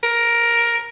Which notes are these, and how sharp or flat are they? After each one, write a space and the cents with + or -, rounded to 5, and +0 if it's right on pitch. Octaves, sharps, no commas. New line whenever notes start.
A#4 +10